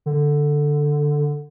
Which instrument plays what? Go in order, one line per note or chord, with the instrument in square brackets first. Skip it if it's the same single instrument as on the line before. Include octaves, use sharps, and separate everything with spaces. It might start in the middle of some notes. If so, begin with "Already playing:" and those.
[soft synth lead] D3